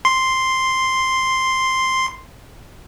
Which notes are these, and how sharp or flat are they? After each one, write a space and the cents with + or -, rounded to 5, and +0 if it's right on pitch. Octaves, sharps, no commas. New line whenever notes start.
C6 +0